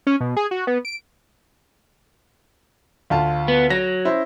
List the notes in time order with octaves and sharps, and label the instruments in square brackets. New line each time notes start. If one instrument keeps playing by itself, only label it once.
[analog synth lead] C#4
B2
G#4
F#4
B3
D7
[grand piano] D2 F4 A5
[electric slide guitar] B3
[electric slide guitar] F#3 [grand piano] A#6
[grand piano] C#4 E4 C5